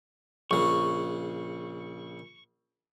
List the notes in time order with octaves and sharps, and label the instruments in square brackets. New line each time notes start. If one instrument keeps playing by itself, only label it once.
[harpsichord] A#1 C#3 [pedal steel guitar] C#6